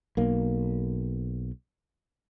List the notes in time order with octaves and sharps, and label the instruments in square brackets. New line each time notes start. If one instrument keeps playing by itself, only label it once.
[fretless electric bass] B1 A#3